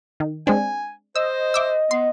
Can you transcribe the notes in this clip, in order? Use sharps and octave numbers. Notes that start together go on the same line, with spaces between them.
D#3
G#3 C4 D4 G#5
C5 D#5 E6
E5 D6 E6
B3 C6